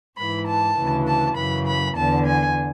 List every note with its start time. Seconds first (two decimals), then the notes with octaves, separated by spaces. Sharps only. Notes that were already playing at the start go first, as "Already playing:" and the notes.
0.18 G#2 E3 B5
0.48 A5
0.77 D2 C#3 E3
1.07 A5
1.37 F#2 C#3 E3 B5
1.67 B5
1.96 E2 D3 A5
2.26 G#5